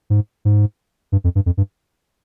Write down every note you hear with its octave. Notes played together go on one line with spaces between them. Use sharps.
G#2
G#2
G2
F2
G2
F2
G2